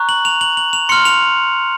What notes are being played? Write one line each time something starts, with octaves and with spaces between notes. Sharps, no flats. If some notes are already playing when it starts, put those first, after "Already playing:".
Already playing: A#5 C#6 F#6
F#7
F7
F#7
F#7
F7
C6 F6 C#7
F7